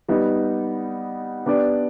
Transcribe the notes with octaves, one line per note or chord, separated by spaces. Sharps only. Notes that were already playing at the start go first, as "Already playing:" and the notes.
G3 B3 D#4
B3 D4 G4 D5